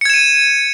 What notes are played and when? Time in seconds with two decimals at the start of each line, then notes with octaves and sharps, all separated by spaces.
0.01 C#7
0.05 G#6
0.10 E7
0.14 D#7